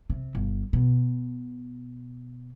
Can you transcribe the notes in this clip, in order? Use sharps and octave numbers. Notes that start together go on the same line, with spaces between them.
C3
G1
B2